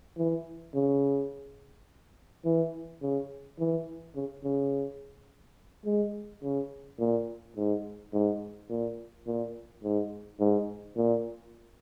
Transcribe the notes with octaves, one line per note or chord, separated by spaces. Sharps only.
E3
C#3
E3
C#3
E3
C#3
C#3
G#3
C#3
A#2
G#2
G#2
A#2
A#2
G#2
G#2
A#2